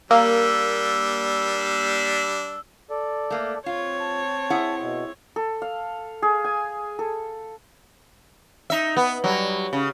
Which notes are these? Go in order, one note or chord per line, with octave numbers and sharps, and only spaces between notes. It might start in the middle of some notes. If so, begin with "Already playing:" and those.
G3 A#3 D4 E6
A4 D5
A3 A#3
C4 F4 C#5
A5
E4 G#4 F#5
B2
A4
F5
G#4
G#5
A4
D#4 E5
B3
F#3 G3
C#3